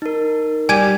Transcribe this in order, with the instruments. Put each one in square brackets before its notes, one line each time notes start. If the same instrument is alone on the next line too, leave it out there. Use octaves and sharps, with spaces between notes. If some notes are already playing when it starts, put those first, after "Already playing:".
[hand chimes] D#4 A#4
[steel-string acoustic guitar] G3 [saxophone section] G4 [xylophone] G#5 G#6 D#7